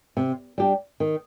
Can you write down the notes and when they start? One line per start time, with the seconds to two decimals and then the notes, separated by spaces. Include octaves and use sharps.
0.17 C3
0.58 G3 D4 G4
1.00 D#3